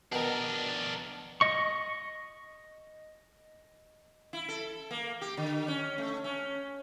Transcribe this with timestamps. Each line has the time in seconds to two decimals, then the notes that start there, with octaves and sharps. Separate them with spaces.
0.12 B2 D#3 D4 A#4
1.41 D#5 C#6
4.33 E4
4.49 A4
4.91 A#3
5.21 G4
5.37 D3
5.68 C#4
5.98 A3
6.24 C#4